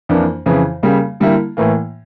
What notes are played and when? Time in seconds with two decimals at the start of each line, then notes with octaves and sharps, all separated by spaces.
0.09 F2 E3 A#3 D4
0.46 F2 C#3 E3
0.83 C#3 G3 A#3
1.20 D3 G3 A#3 E4
1.57 A2 E3 A#3